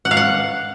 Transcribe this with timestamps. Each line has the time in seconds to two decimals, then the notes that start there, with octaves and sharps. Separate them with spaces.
0.05 F#5
0.11 F5
0.17 F#5